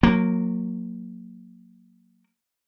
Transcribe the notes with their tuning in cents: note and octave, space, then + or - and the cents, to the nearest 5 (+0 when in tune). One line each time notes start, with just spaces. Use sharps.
F#3 -20 A#3 -10